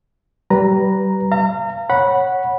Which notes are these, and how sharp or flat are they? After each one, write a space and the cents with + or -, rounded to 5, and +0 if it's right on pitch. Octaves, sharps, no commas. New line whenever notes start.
G3 -30 B4 -10 A#5 +0
F5 -30 A#5 -35
C#5 -10 F#5 +0 B5 -15